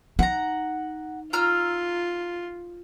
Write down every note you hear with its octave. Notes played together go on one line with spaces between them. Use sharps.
D#4 F#5 A#5
F4 A#5 E6 F6